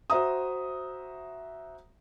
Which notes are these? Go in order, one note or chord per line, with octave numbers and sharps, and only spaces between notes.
F#4 C5 E5 A#5 D#6